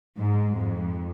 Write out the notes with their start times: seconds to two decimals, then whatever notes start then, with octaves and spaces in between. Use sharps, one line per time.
0.17 G#2
0.57 F2